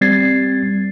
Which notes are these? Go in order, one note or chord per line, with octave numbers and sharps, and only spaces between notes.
G3 C4 G#6 A6 C7